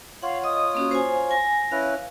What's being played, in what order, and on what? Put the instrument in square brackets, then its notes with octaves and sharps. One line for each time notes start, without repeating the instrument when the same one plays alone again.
[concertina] F4 C#5 [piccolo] F5 [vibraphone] F#5
[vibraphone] D#5 [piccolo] D#6
[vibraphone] A#3 C#4 F#4
C5 F5 G#5
[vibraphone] G#5 [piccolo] A#6
[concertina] C#4 E4 B4 [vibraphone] F5